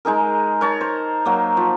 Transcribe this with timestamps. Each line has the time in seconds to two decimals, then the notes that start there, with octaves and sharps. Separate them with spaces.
0.05 G#3 D#4 G#4 A#4
0.61 A#4 C#5 A5
0.81 C5
1.25 F#3 A#3
1.57 F3